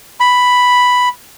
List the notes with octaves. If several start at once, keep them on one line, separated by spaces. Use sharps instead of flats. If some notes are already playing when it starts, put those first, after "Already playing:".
B5